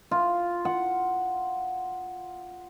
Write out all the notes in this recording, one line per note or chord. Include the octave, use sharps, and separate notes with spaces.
F4
F#5